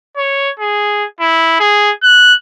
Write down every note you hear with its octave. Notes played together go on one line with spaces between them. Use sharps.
C#5
G#4
E4
G#4
F#6